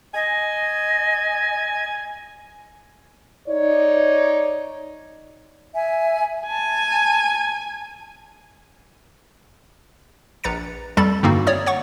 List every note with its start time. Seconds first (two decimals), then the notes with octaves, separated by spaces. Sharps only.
0.14 D#5 G#5
3.48 D#4 C#5 D5
5.73 E5 G#5
6.47 G#5 A5
10.44 A#1 B4 A#5 A6 C#7
10.97 F2 G3 A4 A5 B5 A6
11.23 G2 D3 A#3 C4 D#4 F#4
11.47 C#5 D5 D#6
11.66 C#5 F#5 C#6